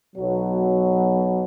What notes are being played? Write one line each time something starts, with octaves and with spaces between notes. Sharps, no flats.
B1 B2 F#3